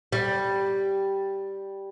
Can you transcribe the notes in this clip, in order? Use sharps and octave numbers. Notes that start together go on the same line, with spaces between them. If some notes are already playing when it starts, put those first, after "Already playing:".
G3